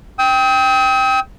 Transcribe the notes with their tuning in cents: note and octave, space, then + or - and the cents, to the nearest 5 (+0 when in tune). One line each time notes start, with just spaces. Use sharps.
G5 +0 D#6 +45